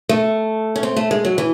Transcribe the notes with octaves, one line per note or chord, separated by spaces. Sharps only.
A3
C#4
C4
A3
G#3
F#3
E3